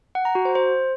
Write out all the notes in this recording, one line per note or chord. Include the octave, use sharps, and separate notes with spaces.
F#5
A#5
F#4
C5
C5